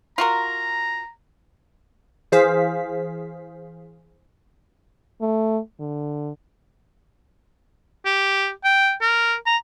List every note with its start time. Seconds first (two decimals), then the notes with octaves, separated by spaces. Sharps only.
0.18 F4 F#4 A#4 A#5
2.32 E3 G#4 C5 F5 B6
5.21 A3
5.80 D3
8.05 G4
8.64 G5
9.01 A#4
9.46 A#5